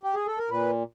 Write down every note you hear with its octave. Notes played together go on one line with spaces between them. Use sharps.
G4
G#4
A4
A#4
A#2 B4